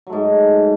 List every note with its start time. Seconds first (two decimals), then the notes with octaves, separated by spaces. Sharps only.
0.07 F#3
0.10 A3
0.13 G#2